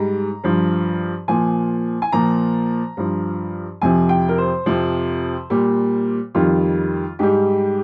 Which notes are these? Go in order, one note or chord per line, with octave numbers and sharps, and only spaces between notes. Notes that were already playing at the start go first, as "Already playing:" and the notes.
Already playing: G#2 G3 A#5
G2 F3
A#2 F3 G#5
G#5
A#2 F3 A#5
G2 F3
F2 C3 F3 G#5
G5
A#4
C5
F2 C3 F3
A#2 G3
F2 D#3 G3 F4
G#2 G3 G4